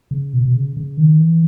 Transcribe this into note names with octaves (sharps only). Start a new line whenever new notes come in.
C#3
B2
B2
C#3
C#3
D#3
E3